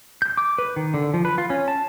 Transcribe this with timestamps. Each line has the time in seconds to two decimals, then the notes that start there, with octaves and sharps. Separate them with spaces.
0.22 G6
0.37 D6
0.58 B4
0.76 D#3
0.94 D3
1.14 F3
1.25 B4
1.38 F4
1.50 C#4
1.68 A5